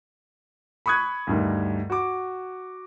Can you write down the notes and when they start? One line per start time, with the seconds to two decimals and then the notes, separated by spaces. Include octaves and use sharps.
0.86 B5 C#6 D#6 F#6 G#6
1.27 D2 G2 D#3
1.90 F#4 D6